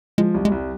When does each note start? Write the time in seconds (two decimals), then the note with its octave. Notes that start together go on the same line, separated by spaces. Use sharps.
0.18 F3 G#3
0.34 C2
0.45 G#3
0.52 C2 G3